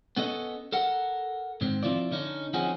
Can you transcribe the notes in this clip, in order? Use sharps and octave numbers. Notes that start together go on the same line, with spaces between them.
B3 C#4 A4 D#5
A4 A#4 F#5
G#2 D#3 C4
F3 C4 E4 F4 D5
D3 C#4 D#4
F3 C4 C#4 D#4 F#4 G#4